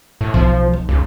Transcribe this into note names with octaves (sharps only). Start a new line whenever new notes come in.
A2
B1 F3
D#3
C#2